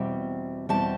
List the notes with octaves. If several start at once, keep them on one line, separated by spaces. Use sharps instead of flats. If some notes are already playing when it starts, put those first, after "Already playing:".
Already playing: E2 B2 G3 C4
E2 B2 G3 C4 A5